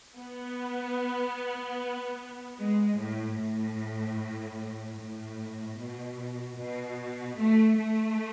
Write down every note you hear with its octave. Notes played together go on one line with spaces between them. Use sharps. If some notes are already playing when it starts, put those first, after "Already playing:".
B3
G#3
A2
A2
A2
B2
B2
A3
A3